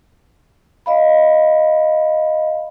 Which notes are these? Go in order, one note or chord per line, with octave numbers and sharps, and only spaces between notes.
D#5 F5 B5